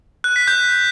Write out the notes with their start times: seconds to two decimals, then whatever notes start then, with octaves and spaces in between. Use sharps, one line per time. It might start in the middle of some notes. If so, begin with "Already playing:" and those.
0.24 F#6
0.36 B6
0.48 G6